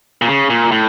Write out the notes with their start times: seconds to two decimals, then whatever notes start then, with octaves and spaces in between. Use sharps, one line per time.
0.22 A#2
0.27 C#3
0.50 A#2
0.72 A2